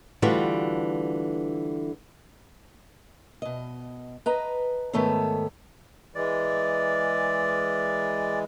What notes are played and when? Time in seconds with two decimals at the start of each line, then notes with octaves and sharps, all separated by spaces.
0.22 D3 E3 G3 A3 F4 F#4
3.42 B2 D#5
4.26 B4 D#5 A#5
4.93 G#2 D#3 A3 B3 A4 C#5
6.15 E3 G#3 D5